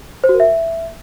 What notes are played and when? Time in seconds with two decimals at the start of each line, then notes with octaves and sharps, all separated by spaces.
0.24 C5
0.29 F#4
0.34 A#4
0.40 E5